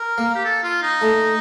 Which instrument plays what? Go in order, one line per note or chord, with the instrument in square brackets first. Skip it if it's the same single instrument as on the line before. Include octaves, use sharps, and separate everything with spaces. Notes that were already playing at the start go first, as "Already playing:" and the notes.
Already playing: [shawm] A#4
[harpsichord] A#3
[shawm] G4
A4
F4
D#4
[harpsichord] A3